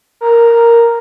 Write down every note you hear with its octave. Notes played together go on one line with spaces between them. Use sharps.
A#4